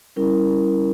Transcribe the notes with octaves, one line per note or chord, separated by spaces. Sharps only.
G3 C#4 E4 A#4